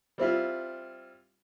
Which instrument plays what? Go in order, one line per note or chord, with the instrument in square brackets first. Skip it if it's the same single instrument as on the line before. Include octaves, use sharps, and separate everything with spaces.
[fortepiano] G3 C4 E4 F4